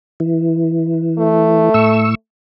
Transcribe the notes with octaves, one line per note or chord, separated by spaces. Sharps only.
E3
A3
A2 C#6 E6